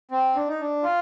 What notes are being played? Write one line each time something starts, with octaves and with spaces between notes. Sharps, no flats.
C4
D4
D#4
D4
F4